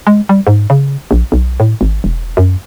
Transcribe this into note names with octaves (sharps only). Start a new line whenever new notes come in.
G#3
G3
G#2
C#3
A#1
B1
A2
G#1
E1
F#2